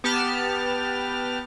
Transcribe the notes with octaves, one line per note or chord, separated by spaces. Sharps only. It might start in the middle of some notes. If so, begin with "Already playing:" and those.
B3 G4 A5 F6